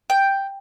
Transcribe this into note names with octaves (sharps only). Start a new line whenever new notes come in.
G5